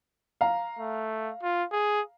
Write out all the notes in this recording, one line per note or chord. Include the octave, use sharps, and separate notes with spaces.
F5 A#5
A3
F4
G#4